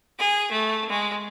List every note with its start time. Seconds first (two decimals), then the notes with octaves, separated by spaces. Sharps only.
0.20 G#4
0.53 A3
0.90 G#3